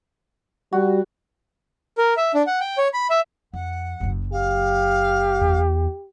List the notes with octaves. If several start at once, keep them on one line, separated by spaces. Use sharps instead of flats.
G3 F#4
A#4
E5
D4
F#5
G5
C#5
B5
E5
F2 F#5
F#1 F#2
G4 F5
E2